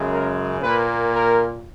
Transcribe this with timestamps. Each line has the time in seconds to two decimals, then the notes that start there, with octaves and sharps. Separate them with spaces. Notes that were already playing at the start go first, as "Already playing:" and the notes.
Already playing: F#2 C#3 G#3
0.10 A#4
0.60 A#2 A#3 B4
1.12 A#4